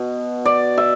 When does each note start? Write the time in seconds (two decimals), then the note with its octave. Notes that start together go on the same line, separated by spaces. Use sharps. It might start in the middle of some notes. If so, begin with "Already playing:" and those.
Already playing: B2
0.45 D5
0.78 E5